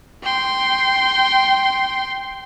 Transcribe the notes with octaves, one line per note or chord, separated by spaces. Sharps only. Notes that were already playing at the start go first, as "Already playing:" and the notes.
G5 C6